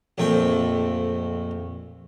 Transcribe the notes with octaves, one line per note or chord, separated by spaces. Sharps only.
A#1 F2 A3 G5